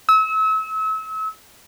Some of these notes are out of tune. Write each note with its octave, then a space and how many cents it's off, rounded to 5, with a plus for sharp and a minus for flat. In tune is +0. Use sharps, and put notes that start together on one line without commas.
E6 -35